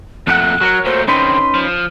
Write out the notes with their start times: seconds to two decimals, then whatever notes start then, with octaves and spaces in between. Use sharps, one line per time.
0.27 F2 A#2 A3 D4 F#5 F#6
0.61 F#3 F#4 A#4 C#5
0.85 A#2 A3 C5
1.08 D3 C4 C#4 D#4 B4 C6
1.54 F3